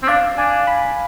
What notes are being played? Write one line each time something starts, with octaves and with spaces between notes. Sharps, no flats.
C4
D4 F5
D4 G#5
B5